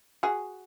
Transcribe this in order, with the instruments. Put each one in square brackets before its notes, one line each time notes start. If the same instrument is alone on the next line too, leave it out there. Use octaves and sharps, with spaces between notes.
[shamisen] F#4 G#4